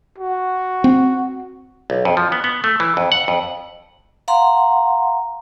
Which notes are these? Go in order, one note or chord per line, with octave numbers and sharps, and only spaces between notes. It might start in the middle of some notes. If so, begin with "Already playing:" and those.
F#4
C4
B1
F2
F3
B3
B3
A3
E3
F2
F#5
F2
F5 F#5 A#5 C6